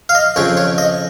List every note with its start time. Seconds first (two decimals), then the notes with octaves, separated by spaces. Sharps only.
0.09 F5
0.15 D#5
0.36 F2 C#3 C#5
0.57 C#5
0.78 D#5